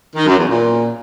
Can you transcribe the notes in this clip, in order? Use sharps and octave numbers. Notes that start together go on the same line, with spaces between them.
D#3
F#2
E2
A#2